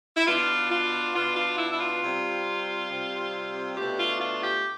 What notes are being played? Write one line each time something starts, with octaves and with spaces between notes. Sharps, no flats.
E4
B2 B3 D4 F4
F4
B2 B3 D4 F4
F4
E4
E4
F4
C3 G3 C4
C3 G3 C4
B2 A3 D4 G4
F4
F4
G4